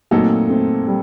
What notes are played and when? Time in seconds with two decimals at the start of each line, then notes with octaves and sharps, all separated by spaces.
0.11 A#2 F#3 A3 A#3 C4 D#4 A4
0.49 A3 C4
0.87 G3